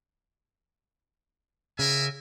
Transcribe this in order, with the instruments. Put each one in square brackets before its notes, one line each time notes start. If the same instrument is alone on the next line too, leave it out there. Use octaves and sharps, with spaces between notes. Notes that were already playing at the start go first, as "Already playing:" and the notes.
[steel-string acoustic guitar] C#3 [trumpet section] A#4 E5 G#5